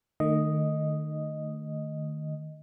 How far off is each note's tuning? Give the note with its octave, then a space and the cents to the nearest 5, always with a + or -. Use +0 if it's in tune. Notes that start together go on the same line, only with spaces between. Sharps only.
D#3 -30 A3 +15 D#5 +0